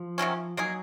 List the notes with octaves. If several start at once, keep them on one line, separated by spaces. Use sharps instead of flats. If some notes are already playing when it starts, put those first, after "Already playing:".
Already playing: F3
C3 D#3 F#3 C#4
F#3 A#3 D#4 G#4